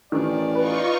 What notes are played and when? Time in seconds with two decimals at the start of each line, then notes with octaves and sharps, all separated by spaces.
0.12 A1 D#3 D5
0.55 D#4 F4 B4 C#6